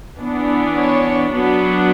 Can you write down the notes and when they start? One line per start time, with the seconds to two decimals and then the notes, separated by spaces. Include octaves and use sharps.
0.17 E3 B3 D4
0.75 C#5
1.31 F#3 B3 D4